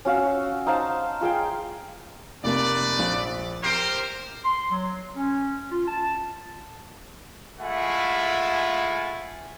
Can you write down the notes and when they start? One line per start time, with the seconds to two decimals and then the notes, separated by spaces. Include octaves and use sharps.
0.05 C#4 F#4 F5 E6
0.25 F#4
0.66 D#4 C5 F5 A5
1.21 F4 G#4 F5 G5
2.44 F1 A3 A#3 B4 D5
2.99 A#1
3.64 G4 A#4 C5 C7 D7
4.44 C6
4.70 F#3
5.16 C#4
5.71 F4
5.87 A5
7.60 G#3 A3 E4 F4 F#5 G#5